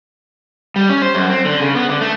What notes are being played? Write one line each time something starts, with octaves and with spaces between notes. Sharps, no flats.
G3
C#4
C5
F#2
C4
D3
C#3
B3
D3
A3